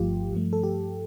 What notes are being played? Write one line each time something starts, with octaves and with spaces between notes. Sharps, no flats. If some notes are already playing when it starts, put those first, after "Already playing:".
Already playing: G1 G2 F3 A3 F4 G4
G2 F3 A3
A4
G4